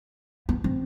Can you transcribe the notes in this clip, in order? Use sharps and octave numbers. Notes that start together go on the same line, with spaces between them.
B3
C4